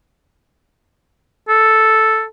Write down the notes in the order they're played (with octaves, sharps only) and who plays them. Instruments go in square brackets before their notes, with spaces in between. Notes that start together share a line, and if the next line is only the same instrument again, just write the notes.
[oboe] A4